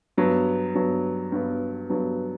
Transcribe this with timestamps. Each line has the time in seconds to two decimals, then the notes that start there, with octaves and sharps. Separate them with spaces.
0.17 G2 F#3 B3
0.75 G2 F#3 B3
1.32 G2 F#3 B3
1.90 G2 F#3 B3